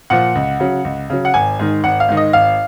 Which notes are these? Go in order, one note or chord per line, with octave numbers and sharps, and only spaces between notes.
A#2 F3 F#5
C#2
C#3 F#3
C#2
C#3 F#3
F#5
G#1 G#5
G#2 D#3
G#1 F#5
F5
G#2 D#3
D#5
G#1 F5